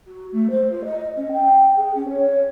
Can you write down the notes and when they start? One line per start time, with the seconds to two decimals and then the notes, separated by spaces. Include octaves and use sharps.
0.07 F#4
0.32 A3
0.50 C5
0.70 F4
0.84 D#5
1.16 C#4
1.32 G5
1.76 G#4
1.95 C#4
2.09 C#5